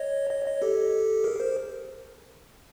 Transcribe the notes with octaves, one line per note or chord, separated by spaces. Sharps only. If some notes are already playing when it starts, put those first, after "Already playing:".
Already playing: C#5 D#5
C#5 D#5
C#5 D#5
G4 A4
G#4 A#4
A#4 C5